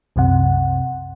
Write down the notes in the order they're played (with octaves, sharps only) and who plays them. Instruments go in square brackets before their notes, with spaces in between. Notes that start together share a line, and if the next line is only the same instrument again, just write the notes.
[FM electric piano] C2 F#2 C3 F#5